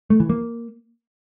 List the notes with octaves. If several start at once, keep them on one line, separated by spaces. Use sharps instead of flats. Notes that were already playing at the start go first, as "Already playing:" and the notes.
A3
E3
A#3